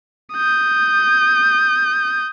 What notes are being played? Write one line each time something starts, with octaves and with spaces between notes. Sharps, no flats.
D#6 G6